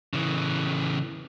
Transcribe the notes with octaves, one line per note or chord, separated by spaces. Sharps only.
C#3 E3